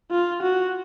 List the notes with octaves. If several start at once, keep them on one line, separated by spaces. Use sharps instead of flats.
F4
F#4